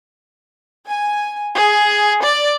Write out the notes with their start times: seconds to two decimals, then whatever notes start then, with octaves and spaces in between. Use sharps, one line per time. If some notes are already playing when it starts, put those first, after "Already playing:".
0.86 G#5
1.56 G#4
2.22 D5